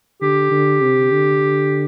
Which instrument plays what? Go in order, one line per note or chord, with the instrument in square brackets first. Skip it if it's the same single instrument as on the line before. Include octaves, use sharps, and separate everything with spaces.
[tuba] D3 [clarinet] G4
[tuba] D3
C3
D3